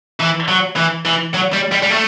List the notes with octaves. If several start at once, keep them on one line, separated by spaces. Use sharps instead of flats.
E3
F#3
E3
E3
F#3
G3
G3
G3
A3